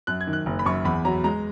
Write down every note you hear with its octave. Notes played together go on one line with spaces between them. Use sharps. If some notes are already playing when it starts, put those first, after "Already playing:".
F#2 F#6
G#6
D#3
F#6
F#1
B5
F#2 C#6
E2 B5
F#3 A#5
G#3 A#5